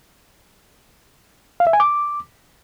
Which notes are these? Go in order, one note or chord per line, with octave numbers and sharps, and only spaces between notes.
F5
E5
G#5
D6